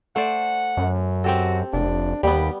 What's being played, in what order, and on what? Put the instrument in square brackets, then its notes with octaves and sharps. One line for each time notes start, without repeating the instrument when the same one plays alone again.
[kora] A3 C5 D5 [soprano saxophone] F#5
[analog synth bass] F#2
[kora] C4 G4 A4 [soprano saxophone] F#4
[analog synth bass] F1 [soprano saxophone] D4
[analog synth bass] D#2 [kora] G3 B3 [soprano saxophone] G4